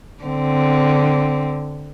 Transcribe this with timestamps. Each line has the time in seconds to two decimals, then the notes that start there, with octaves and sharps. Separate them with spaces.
0.23 D3 C4